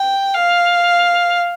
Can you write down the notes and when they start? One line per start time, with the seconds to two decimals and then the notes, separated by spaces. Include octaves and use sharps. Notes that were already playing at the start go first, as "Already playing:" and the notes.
Already playing: G5
0.35 F5